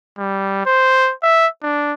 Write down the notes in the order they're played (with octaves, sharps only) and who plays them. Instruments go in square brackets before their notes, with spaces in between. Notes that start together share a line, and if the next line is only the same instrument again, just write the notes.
[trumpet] G3
C5
E5
D4